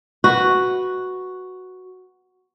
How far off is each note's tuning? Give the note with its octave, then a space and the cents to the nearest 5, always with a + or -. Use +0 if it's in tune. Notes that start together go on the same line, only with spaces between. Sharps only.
F#4 +0 B4 +0